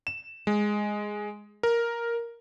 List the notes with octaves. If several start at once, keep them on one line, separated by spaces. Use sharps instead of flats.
E7
G#3
A#4